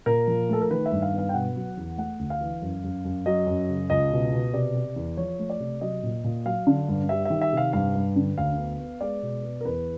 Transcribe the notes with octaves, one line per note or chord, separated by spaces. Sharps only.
A#2 A#4
F3
A3 A4
A#4
D#3 B4
E5
G2
F5
B3
F5
G5
B2 F#5
F#3
E2
A3 F#5
D2
F5
E3
F#2
F#2
F#2
F#3 D#5
F#2
C#3
C#2 D#5
B2
B2
C3 D5
C3
E2
F3 C#5
A3
D5
C3
F#3 D#5
A#2
A#2
F#3 F5
D3
G2
G3 E5
D#3 E5
E5
C3 F5
G2 F5
G2
D3
D2 F5
B3
B3
G#3 D5
B2
B3
A#4
E2 B4